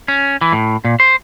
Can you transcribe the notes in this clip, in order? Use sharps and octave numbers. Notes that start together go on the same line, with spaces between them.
C#4
E3
A2
A#2
C5